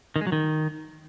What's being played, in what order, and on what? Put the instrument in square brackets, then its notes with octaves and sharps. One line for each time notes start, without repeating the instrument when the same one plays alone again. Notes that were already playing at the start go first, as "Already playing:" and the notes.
[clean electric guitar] D#3
G#3
F#3
D#3